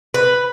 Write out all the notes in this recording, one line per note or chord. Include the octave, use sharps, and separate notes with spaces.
B4